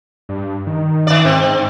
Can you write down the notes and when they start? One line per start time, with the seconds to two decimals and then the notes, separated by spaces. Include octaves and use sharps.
0.29 G2
0.67 D#3
1.07 D#3 D5
1.25 G#2 C4